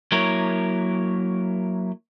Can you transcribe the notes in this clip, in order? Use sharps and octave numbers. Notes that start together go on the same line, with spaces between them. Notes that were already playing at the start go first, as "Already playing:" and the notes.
F#3 A#3 E4 A#4 C#5